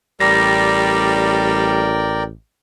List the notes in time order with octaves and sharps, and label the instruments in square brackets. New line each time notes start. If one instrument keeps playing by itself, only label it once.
[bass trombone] A1 [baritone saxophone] G3 [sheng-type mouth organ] A#4 D5 G5 [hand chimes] A#6